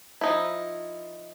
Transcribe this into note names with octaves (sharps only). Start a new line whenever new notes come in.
F3 D#4 E4